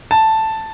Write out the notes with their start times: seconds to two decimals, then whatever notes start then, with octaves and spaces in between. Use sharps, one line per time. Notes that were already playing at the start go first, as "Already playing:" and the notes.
0.11 A5